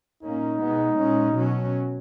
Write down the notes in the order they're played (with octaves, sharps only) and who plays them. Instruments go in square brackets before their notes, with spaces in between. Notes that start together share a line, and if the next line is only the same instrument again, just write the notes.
[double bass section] A#2 A#3 C#4 [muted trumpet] D#4
[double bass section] B2 G#3 B3
A#2 G#3 C#4
B2 F#3 C#4